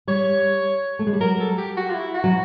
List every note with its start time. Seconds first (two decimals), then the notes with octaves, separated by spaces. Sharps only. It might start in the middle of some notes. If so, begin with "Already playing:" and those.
0.07 G3 C#5
0.99 A3
1.07 G#3
1.13 G3
1.20 F#3 A#4
1.40 A4
1.58 G4
1.77 F#4
1.89 F4
1.95 E4
2.14 F#4
2.24 F#3